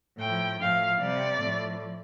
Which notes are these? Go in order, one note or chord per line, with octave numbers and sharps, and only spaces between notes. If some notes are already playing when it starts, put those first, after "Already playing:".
A2 F3 G5
A2 F3 F5
C3 G3 D5
A2 F3